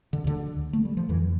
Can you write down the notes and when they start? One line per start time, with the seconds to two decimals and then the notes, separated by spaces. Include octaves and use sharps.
0.13 D3
0.24 D2 D3
0.73 A3
0.85 G3
0.97 F3
1.09 F2 D3 E3